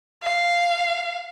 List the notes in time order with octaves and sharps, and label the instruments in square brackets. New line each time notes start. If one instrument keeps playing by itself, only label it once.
[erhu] F5